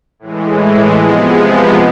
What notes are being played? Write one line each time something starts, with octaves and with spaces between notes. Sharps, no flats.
A2 E3 G#3
C3 F3 G#3 B3